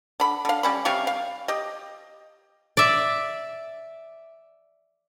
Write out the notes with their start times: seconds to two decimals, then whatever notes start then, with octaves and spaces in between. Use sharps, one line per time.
0.20 D3 B5
0.45 D3 F5
0.63 G3 C#4 B5
0.85 C3 G3 F5 C#6
1.07 F5
1.48 G4 D#5
2.77 D5 E5